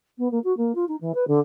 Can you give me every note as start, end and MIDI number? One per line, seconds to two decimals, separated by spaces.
0.18 0.30 59
0.31 0.39 58
0.44 0.56 66
0.57 0.72 58
0.75 0.85 65
0.88 0.96 63
1.01 1.12 52
1.15 1.27 71
1.28 1.39 50